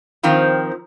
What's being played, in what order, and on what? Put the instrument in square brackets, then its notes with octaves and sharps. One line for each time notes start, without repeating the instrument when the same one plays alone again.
[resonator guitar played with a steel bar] D#3 F3 C4